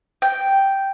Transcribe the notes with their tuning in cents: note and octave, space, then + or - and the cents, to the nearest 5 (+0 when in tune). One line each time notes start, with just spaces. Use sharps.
G5 -5